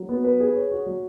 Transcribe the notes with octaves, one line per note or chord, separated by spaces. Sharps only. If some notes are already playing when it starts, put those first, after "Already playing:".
Already playing: F#3
B3
B4
G#4
C#5
F#4
F#3